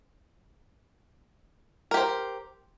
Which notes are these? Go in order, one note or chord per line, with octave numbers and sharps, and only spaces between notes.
G4 A#4 C5